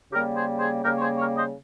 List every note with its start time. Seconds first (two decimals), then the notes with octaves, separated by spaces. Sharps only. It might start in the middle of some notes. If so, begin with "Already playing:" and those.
0.11 C#3 G3 A#3 G4 A#4
0.35 G#4 C5
0.59 G#4 C5
0.82 C#3 G3 A#3 G4 A#4
0.96 C#5
1.01 G#4 C5
1.18 A#4 C#5
1.36 C5 D#5